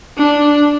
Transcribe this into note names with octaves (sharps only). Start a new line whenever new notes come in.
D4